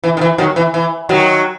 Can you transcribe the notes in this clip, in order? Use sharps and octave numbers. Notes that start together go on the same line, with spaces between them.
E3
D#3
E3
D#3 F#3
E3
E3
D#3 F#3